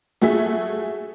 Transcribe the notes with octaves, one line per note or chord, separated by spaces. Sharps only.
A3 F#4 G#4 E5